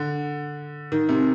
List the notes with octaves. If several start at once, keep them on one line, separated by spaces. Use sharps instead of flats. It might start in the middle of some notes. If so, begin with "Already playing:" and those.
Already playing: D3
D#3
C3